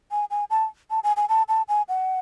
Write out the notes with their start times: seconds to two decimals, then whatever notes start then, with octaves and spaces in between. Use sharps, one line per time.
0.11 G#5
0.31 G#5
0.50 A5
0.90 A5
1.03 G#5
1.16 G#5
1.29 A5
1.48 A5
1.68 G#5
1.89 F#5